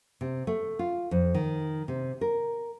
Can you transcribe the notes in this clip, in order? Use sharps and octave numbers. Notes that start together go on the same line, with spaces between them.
C3
A3
F4
F2
D#3
C3
A#4